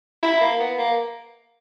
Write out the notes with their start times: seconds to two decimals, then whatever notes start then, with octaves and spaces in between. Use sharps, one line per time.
0.23 E4
0.41 A#3
0.60 B3
0.78 A#3